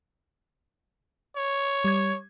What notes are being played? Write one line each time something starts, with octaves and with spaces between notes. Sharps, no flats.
C#5
G3 G#6